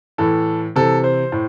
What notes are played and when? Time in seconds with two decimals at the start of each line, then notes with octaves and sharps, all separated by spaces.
0.18 A2 E3 A4
0.76 C3 E3 A4
1.04 C5
1.32 A2